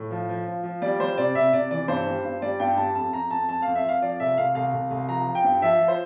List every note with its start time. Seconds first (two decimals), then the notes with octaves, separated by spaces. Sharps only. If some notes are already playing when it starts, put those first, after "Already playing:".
Already playing: A2
0.11 F3
0.29 F3
0.46 F3
0.63 F3
0.82 G3 D5
0.99 G3 C5
1.17 C3 D5
1.35 C3 E5
1.53 C3 D5
1.71 E3 D5
1.88 G2 C5
2.06 G3
2.24 G2
2.42 G3 D5
2.60 G2 G5
2.78 G3 A5
2.95 F2 A5
3.13 F2 A#5
3.30 F2 A5
3.48 F2 A5
3.62 F2 F5
3.75 E5
3.84 F2 F5
4.02 F3 D5
4.20 C2 E5
4.38 C2 F5
4.55 C2 F5
4.73 C2
4.91 C2
5.08 F3 A#5
5.27 F3
5.35 G5
5.44 G2
5.62 F3 E5
5.80 F3
5.88 C5